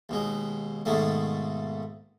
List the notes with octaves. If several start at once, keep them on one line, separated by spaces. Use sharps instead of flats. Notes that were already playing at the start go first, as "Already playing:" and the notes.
D#2 B2 G#3
G#2 B2 D#3 A3 A#3